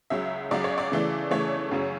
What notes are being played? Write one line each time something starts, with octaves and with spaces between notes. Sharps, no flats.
C#2 C#3 F#3 E5
C#2 C#3 F#3 D5
C#5
D5
C#3 E3 A3
C#3 E3 A3 C#5
F#2 C#3 F#3 C#4